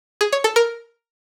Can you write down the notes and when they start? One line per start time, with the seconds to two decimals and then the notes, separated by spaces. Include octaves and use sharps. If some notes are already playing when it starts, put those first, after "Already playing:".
0.21 G#4
0.32 C#5
0.44 A4
0.56 A#4